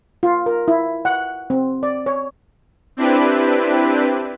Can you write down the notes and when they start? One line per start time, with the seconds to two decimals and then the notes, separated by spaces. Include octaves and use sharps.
0.23 F4
0.46 A#4
0.68 E4
1.05 F#5
1.50 C4
1.83 D5
2.06 C#5
2.97 C4 D4 E4 G4 B4